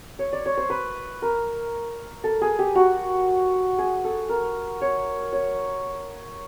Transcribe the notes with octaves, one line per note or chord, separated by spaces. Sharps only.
C#5
D5
C#5
C5
B4
A#4
A4
G#4
G4
F#4
G#4
A4
A#4
C#5
C#5